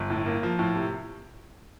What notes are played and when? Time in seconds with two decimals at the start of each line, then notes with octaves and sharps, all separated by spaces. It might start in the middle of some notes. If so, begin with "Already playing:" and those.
Already playing: G1
0.10 A2
0.26 A#3
0.43 F3
0.59 A2
0.75 C3